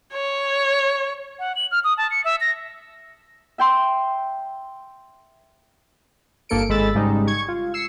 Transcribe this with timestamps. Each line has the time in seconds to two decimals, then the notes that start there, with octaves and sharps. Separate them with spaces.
0.13 C#5
1.39 F#5
1.56 F#7
1.71 F6
1.84 D#6
1.98 A5
2.11 C#7
2.25 E5
2.41 A#6
3.58 E5 G5 C6
6.49 G1 G2 A#3 A4 C#7 D7
6.69 G#1 G#3 A4 B5 E6 A6
6.95 G#2 C#3 G3 G#3 D#4
7.27 C#6 G#6
7.48 F4
7.74 E6 C7 C#7